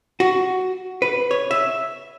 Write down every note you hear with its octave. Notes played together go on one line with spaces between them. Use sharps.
F#4
B4
C#5
E5